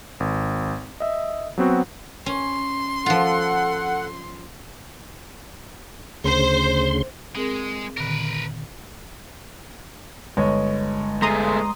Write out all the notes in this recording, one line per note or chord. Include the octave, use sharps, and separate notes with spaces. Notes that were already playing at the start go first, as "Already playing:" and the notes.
G#1
D#5 E5
F#3 B3 C4 F#4
C#4 C6
F3 F4 A4 F#5
D2 C#3 C5 C6
G#3 C4 G#4 A#4
A#2 D3 D#3 A#4 B4
G1 G#3 C#5 D#5
A3 G#4 A#5 C6 D#6